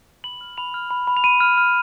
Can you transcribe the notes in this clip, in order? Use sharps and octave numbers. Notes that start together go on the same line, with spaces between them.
B5 F#7
F6
B5 F7
F6
B5
B5
F7
B5 D#7
F6
F6